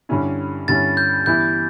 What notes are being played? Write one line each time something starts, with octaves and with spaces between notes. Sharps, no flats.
G2 D3 G3 C#4 E4
G2 D3 G3 C#4 E4 A6
G6
G2 E3 B3 E4 G6